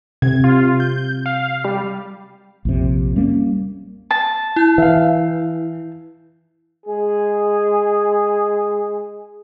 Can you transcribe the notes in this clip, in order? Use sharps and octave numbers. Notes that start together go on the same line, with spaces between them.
C3 G#6
F4
G6
F5
G3
A#1 F2 C3
G3 A#3 C#4
A5
E4 G6
E3 E5 F5
G#3 G#4